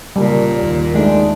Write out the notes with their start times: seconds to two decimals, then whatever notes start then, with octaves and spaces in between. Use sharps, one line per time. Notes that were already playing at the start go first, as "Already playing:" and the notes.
0.16 A#2 C#3 G3 A#3
0.59 D#2
0.95 G#3 A3 D4 D#4